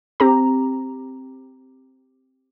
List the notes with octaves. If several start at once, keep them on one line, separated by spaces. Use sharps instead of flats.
C4 G4 A#5